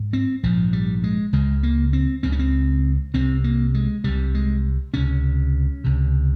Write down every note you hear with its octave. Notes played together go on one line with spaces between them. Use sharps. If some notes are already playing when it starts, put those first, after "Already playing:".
Already playing: G#2
C4
A#1 G#2 F3
G3
G#3
C#2 C#3 G#3
A#3
C4
C#2 C#3 C4
C#4
C4
C2 C3 C4
A#3
G#3
C2 C3 G3
G#3
C#2 C3 C#4
C#2 C3